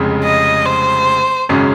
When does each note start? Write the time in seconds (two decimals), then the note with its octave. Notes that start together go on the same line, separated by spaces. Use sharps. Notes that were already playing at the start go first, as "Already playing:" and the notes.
Already playing: F1 F2 C#3 G#3
0.24 D#5
0.65 C5
1.49 G#1 F#2 C#3 G#3 C#4